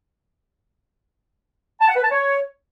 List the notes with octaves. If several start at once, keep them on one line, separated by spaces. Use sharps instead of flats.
A5
F#5
B4
A5
C#5